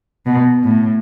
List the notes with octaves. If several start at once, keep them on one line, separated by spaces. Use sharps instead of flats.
B2
A2